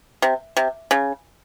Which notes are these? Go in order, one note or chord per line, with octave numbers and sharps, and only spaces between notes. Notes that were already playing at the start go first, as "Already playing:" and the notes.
C3
C3
C#3